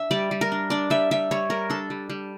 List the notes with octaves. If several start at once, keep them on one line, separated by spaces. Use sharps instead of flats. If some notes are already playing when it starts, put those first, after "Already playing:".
Already playing: D4 E5
G3 D5
G3
A#4
D4
D4 D5
G3 E5
G3 E5
G3 C#5
G3 A#4
D4 A4
G3
G3